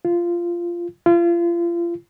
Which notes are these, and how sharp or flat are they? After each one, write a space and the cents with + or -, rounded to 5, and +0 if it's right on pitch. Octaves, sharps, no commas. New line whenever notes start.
F4 -15
F4 -35